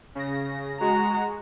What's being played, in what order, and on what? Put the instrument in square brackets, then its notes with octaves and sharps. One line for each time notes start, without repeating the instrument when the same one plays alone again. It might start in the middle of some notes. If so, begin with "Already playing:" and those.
[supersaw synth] C#3 A#6
[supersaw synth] G#3 F#4 [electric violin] A#5